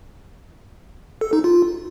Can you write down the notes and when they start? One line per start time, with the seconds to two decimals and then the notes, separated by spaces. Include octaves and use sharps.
1.21 A4
1.33 D#4
1.44 F4